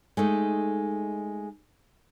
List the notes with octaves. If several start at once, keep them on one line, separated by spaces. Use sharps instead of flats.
G#3 A3 D#4